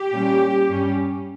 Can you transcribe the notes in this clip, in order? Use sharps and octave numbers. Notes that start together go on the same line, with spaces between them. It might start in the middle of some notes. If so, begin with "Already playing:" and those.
Already playing: G4
A#2 G3 C#4
G2 G3 C#4